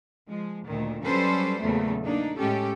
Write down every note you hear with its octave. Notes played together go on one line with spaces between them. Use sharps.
F3 G#3
D2 A#2 D#3
F#3 G3 C#4 A4 B4 C5
E2 A#2 C#3 F#3 A3
A#3 D4 D#4
A2 G#3 C#4 G4 A4